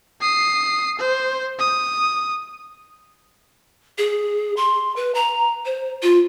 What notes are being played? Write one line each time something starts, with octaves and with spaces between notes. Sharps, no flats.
D#6 C7
C5
D#6
G#4
C6
B4
A#5
C5
F4